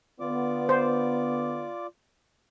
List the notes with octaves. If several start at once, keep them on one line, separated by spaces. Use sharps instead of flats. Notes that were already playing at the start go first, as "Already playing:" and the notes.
D3 B3 F4 D5 D6
C5